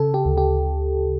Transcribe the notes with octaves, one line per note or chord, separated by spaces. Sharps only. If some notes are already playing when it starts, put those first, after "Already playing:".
Already playing: C#3 A4
G4
D2
G4